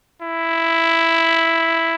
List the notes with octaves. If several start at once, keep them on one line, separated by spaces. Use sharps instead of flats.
E4